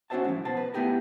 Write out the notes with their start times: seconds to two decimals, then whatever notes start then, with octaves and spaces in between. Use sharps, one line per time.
0.10 C#4 F#4 G#4 C5 E5 A5
0.24 A2 F3
0.45 B2 B3 C5 A5
0.57 B4
0.74 A3 B3 E4 G4 G#4 A#4